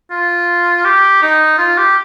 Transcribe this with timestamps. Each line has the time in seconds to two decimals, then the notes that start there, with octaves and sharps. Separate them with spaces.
0.11 F4
0.85 G4
1.22 D#4
1.58 F4
1.78 G4